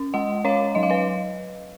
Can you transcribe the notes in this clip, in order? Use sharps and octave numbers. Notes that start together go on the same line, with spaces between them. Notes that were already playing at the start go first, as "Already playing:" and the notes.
Already playing: C#4
G#3 D#5 F#5
C#4 C#5 F5
F#3 D#5
F5
B4 D#5